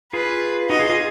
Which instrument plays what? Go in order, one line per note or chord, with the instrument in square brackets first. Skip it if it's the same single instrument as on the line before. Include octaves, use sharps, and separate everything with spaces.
[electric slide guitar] F4 G#4 [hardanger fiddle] B4
[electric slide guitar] D#4 F#4 [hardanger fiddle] D#5
[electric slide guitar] F4 G#4
F4 G#4